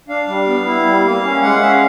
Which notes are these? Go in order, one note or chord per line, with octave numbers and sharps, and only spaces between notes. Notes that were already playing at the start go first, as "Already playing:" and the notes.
D4 F5
G3
B3
E4
G3
A#3
C#4
G#3 F#5
C#4 E5
F5